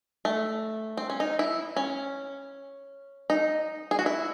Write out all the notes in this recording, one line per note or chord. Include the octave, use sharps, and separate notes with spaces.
A3
C4
C#4
D#4
E4
C#4
D#4
G#4
F#4
E4